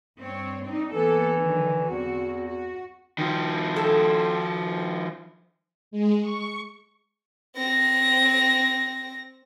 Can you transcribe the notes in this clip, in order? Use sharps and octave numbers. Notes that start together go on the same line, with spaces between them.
G2 C4 C#5
C4 D4 D#4
E3 A#3 B3 A4
D3 D#3 F#3
E2 C4 F#4
F#4
D#3 F3
A4
G#3
C#6
C4 A#6